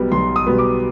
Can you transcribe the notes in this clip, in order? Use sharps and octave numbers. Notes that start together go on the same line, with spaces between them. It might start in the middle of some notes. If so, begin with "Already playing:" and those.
Already playing: B1 B2 G3 B3
B1 C6
D#6
B2 G3 B3
D6